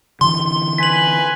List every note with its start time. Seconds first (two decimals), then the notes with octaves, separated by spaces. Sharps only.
0.21 D3 E3 C6
0.78 B4 G#5 B6 F#7